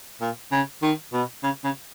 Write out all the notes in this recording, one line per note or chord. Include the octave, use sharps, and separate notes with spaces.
A#2
C#3
D#3
B2
C#3
C#3